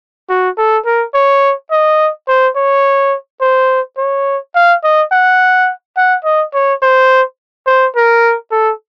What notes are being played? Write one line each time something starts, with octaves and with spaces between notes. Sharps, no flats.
F#4
A4
A#4
C#5
D#5
C5
C#5
C5
C#5
F5
D#5
F#5
F#5
D#5
C#5
C5
C5
A#4
A4